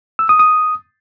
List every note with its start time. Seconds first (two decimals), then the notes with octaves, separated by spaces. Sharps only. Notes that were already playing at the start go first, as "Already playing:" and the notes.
0.19 E6
0.29 D#6
0.39 D#6